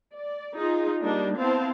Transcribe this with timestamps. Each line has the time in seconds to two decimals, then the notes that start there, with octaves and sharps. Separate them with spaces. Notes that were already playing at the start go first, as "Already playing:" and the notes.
0.15 D5
0.56 D#4 F4 G#4
1.03 G3 A#3 D4 D#4
1.39 B3 C4 E4 C5 F5 A5